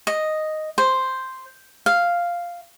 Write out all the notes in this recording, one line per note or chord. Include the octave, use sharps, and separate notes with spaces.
D#5
C5
F5